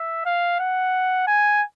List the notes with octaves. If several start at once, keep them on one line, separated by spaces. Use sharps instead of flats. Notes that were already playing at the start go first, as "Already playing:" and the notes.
Already playing: E5
F5
F#5
G#5